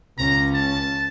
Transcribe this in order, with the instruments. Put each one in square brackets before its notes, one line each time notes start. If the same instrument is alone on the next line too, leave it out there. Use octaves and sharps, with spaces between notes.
[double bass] C#2 C#4 [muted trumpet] A#5
[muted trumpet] A5